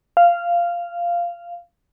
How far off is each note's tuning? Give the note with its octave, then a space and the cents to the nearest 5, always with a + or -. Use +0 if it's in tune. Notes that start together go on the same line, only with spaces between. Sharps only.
F5 -10